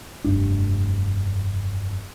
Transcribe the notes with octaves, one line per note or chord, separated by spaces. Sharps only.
F1 G2 D4